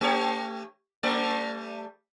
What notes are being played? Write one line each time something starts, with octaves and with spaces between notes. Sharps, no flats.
A3 G4 C#5
G3 A3 D5